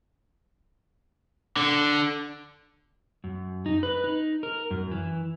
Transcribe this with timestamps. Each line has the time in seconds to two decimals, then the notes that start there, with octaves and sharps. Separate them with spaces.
1.57 D3
3.24 F#2
3.66 D#4
3.83 B4
4.04 D#4
4.43 A#4
4.71 F#2
4.91 E3